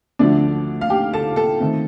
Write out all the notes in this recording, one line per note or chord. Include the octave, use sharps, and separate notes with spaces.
D2 D3 F3 A3 D4 D5
F5
G4 G5
A4 A5
A4 A5
D#3 A3 C4